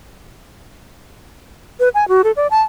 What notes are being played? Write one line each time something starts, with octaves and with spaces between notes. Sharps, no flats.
B4
G#5
F#4
A4
D5
A5